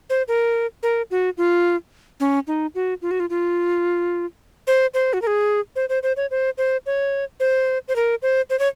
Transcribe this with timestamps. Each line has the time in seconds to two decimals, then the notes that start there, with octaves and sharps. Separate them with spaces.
0.10 C5
0.28 A#4
0.83 A#4
1.11 F#4
1.38 F4
2.20 C#4
2.47 D#4
2.75 F#4
3.02 F4
3.11 F#4
3.20 F4
3.30 F4
4.67 C5
4.94 C5
5.13 F#4
5.22 A#4
5.27 G#4
5.76 C5
5.89 C5
6.03 C5
6.17 C#5
6.31 C5
6.58 C5
6.86 C#5
7.40 C5
7.88 C5
7.96 A#4
8.22 C5
8.50 C5
8.59 C#5